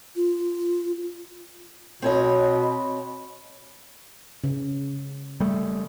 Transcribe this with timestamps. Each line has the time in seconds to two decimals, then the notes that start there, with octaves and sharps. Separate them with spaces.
0.16 F4
2.02 B2 C4 C#5 D#5
4.44 C#3
5.40 G3 A3